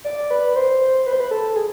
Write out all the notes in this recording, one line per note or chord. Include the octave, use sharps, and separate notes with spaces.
D5
B4
C5
B4
C5
B4
A4
G#4